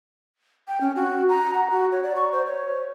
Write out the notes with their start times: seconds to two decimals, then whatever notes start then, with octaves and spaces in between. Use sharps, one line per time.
0.68 G5
0.81 C#4
0.96 F#4
1.29 A#5
1.54 F#5
1.70 F#4
1.92 C#5
2.03 D5
2.16 C#6
2.32 C5
2.46 C#5